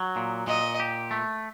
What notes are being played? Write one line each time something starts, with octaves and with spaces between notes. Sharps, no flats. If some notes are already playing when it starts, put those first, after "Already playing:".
Already playing: F#3
A#2
A#2 D#5
G4
A3